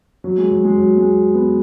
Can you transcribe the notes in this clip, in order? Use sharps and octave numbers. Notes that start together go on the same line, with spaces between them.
F#3
G#3
F#3
G#3
F#3
G#3
B3